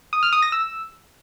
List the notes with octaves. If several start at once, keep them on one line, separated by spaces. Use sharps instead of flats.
D#6
F6
D#6
A#6
E6